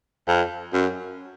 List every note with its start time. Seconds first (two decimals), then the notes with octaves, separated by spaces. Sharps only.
0.28 F2
0.73 F#2